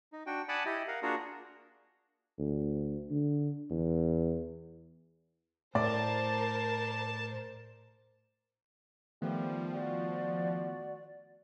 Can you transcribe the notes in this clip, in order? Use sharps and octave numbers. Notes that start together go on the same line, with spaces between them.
D#4
D4 F#4 G5
D5 F#5 G#5 A5 B5 D#6
E4 G4 D#5
A#4 F5 F#5
A#3 D4 F4 F#4 G#4 A#4
D2
D3
E2
A2 A#4 C5 D5 A5
D#3 F3 G3 A3 B3
F#4 D5